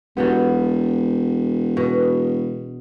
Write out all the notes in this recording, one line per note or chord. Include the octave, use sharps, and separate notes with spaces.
E1 F#3 G3 B3
B2